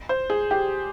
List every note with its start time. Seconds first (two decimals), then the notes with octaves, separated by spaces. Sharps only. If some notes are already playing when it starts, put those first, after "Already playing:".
0.09 C5
0.30 G#4
0.51 G4